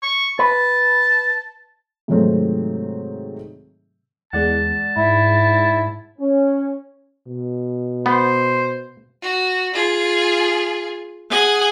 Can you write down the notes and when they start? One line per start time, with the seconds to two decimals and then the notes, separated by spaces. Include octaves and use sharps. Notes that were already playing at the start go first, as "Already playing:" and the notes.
0.02 C#6
0.39 B4 A5
2.08 G#2 C3 D#3 F#3 A3 C4
4.33 E2 G#3 D5 F#5 A5
4.96 G#2 E4
6.19 C#4
7.28 B2
8.06 B3 C5
9.22 F#4
9.74 F4 G#4
11.30 G#4 F#5 G#5